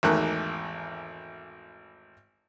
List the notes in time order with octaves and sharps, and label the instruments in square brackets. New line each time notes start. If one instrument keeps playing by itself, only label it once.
[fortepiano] G#1 E2 D#3 A3 F#6